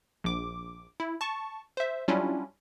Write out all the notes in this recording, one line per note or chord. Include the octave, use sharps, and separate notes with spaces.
A#1 D6
E4
A5 C#6
C5 E5
F#3 G3 C#4 D4 E4 F4